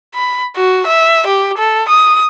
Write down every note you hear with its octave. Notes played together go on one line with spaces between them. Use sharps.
B5
F#4
E5
G4
A4
D#6